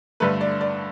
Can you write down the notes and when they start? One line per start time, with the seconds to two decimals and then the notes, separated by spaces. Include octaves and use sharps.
0.20 G2 D3 A3 B4
0.41 D5
0.61 D5